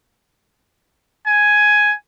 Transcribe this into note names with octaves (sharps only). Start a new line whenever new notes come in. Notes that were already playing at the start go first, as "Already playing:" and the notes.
G#5